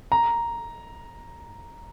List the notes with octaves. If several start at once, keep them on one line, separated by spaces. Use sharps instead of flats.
A#5